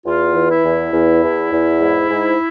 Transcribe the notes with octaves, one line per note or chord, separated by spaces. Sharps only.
E2 F4
E3
E4
E2
E2
E2
E2
G#2
G#2